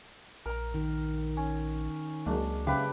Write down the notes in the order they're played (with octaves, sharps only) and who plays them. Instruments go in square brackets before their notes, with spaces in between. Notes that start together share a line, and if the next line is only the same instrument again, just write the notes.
[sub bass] A#1 [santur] A#4 A#5
[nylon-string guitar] D#3
[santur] C#4
[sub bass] C#2 [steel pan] F#3 G#3 A#3 [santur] D4
[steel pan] C#3 [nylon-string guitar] G#3 E5 F5 [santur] G4 B4